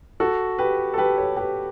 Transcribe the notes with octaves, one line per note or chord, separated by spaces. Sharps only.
F#4 A4
G4 B4
A4
G4 B4
A4 C#5
G4 B4